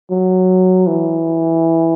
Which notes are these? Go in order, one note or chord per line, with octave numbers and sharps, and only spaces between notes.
F#3
E3